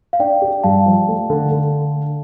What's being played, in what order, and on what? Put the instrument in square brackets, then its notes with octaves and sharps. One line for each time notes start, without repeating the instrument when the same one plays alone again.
[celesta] F5
[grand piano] D4 [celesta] D5 G5
[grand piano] G4
[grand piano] G2 [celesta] F5 A5
[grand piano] F3
A3
D3
D3